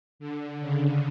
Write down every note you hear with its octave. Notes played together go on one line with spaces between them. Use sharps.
D3
C#3